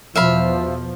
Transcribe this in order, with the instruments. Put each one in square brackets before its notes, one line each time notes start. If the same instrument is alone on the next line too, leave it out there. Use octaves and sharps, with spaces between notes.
[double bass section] E2 B2 F3 [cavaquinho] E5 F5 B5